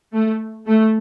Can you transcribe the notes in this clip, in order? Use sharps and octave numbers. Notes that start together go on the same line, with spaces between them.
A3
A3